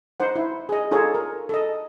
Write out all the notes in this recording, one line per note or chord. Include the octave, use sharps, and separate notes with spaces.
D#4 C5 F#5
E4
G#4 D#5
D#4 F4 G#4 A4 C#5
A#4
A4 D#5